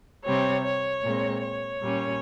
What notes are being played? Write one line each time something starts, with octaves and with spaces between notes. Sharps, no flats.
C3 G3 C4 C#5
C#5
A#2 G#3 C4
C#5
A#2 G3 C#4